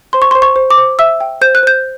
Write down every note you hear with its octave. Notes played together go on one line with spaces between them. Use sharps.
C5 C6
C#6
C6
C5
C#6
C5
D6
C5
E5 E6
G5
C5 G6
F#6
C5 G6